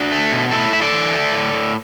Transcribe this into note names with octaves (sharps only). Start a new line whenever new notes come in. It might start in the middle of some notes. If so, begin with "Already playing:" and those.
Already playing: D4 F#4
A3
B2
A2 E4 A4
A2 E5
A4 D5
E3
A3
A2
A2